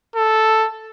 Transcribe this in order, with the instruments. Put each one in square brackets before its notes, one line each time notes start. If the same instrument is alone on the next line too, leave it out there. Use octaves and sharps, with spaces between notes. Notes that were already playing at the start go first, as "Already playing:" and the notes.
[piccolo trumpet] A4